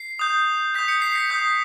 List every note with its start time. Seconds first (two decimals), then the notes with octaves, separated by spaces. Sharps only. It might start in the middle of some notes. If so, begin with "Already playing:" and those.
Already playing: C7
0.19 D#6 G6
0.75 D#6 G6 B6
0.88 C#7
1.02 C7
1.16 B6
1.30 D#6 G6